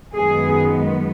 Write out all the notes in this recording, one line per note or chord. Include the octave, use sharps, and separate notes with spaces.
F#2 D#3 G#3 B3 G#4